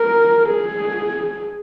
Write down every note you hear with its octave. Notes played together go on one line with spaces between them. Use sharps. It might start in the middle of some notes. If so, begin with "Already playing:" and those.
Already playing: A#4
G#4